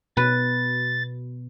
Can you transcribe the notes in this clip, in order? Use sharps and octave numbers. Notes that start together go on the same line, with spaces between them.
B2 B4 A6